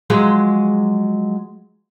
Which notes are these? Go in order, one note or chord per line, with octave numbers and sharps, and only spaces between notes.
F3 F#3 G#3